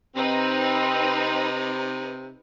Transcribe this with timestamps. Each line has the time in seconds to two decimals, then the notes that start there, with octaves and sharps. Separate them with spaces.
0.16 C3 C4 D#4 B4